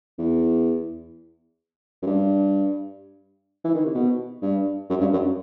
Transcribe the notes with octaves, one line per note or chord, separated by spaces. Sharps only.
E2
F#2
G2
E3
D#3
C3
B2
G2
F#2
G2
F#2